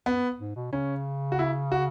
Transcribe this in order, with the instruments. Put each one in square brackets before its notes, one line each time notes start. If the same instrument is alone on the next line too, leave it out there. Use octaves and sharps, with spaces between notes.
[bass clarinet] F#2 [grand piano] B3
[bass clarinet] G#2
B2
[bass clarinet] C#3 [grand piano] C#4
[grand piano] F#4
E4
F#4